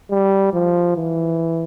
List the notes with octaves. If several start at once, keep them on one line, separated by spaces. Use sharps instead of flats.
G3
F3
E3